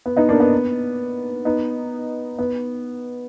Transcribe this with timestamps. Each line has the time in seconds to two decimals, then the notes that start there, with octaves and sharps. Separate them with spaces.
0.06 B3
0.17 B3 D#4
0.29 A#3 D4
0.40 B3
1.45 B3 D#4
2.39 B3